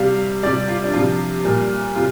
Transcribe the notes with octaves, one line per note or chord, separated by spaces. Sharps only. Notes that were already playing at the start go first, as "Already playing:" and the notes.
Already playing: C3 G3 F5
C3 G3 D5
F4
D4
C3 F3 F4
A#2 G3
C3 F4